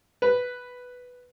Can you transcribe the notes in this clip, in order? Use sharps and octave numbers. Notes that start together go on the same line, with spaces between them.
B4